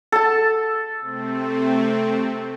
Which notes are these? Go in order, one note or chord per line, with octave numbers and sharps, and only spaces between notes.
A4 A5
C3 A3 C4